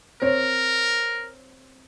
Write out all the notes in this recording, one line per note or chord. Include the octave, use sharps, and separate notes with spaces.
C4 A#4 C#5